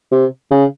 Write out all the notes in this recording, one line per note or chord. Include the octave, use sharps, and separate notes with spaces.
C3
C#3